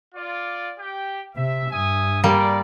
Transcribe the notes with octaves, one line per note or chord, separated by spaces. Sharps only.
F4 D5
G4 G5
C3 E5
G2 E5 G#5 D#6
G3 A#3 G#4 A#4 D5